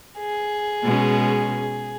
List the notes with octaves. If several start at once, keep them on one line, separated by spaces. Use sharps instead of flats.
G#4
B2 G#3 C#4